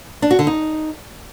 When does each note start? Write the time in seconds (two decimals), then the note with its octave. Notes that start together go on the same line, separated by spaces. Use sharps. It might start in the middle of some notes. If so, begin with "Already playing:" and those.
0.22 D4
0.31 F#4
0.39 D3
0.47 D#4